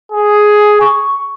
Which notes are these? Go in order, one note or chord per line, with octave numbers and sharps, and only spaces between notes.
G#4
C#6